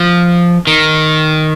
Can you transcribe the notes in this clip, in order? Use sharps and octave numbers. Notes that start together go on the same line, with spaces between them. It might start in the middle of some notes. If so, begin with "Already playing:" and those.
Already playing: F3
D#3